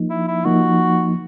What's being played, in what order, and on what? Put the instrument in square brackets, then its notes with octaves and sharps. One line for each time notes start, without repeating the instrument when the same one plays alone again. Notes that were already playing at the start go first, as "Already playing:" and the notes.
Already playing: [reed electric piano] F3 A#3 D#4
[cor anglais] E4
E4
[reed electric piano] F3 A#3 D#4 [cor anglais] F#4